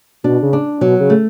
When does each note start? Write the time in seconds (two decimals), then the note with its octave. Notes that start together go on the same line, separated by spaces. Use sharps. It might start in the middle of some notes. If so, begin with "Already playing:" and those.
0.24 B2 D4
0.43 C#3
0.53 D4
0.81 B2 F#3
1.00 C#3
1.10 A3